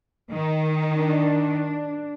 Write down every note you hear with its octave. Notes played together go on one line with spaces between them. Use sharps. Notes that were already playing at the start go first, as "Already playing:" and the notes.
D#3
D4